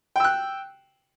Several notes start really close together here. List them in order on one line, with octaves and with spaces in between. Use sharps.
G5 E6 F#6